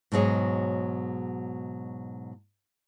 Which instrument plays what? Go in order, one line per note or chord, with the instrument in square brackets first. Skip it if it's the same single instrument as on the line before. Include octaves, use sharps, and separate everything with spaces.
[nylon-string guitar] G#2 B2 F#3 G#4 C#5